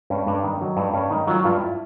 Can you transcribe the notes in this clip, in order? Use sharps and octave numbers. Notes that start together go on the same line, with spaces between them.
G2 C#4
G2 D4
D#3
F#3 D#4
G2
G2 C#4
D#3 D#4
F#3 F4
G2 F4
E4